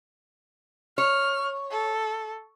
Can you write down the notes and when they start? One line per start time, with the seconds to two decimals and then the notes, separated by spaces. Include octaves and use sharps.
0.98 C#5 F6
1.72 A4